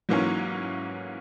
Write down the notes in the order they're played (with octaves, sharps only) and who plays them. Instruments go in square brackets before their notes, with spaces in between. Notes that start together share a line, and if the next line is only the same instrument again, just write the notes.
[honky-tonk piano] G#2 E3 A#3 C#4 [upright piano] F#3